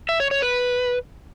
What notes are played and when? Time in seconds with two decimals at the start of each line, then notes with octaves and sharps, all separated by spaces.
0.09 E5
0.20 C#5
0.31 C#5
0.42 B4